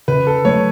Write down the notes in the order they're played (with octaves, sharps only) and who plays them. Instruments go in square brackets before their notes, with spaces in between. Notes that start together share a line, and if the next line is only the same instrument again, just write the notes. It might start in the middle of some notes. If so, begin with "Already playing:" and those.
[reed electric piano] C#3 [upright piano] B4
[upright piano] A4
[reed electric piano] F#3 A3 [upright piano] C#5